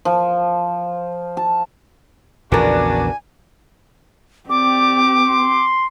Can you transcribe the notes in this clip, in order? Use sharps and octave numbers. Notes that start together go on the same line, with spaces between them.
F3
A5
A#1 E2 C#3 B3 D4 F#4 A#4 G#5
C4 G4 D5 D6
C6